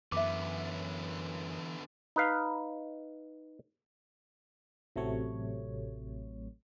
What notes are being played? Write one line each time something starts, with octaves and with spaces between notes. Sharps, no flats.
F#2 D3 E3 B3 E5 D6
D#4 B4 F5
A1 C3 F#3 A3 C#5